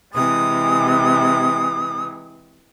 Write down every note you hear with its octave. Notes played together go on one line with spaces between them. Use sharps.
C3 E3 G#3 D#6